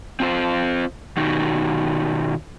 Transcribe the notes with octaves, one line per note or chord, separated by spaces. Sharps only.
C4 F4 C5
B2 D#3 D#4 F#4 G4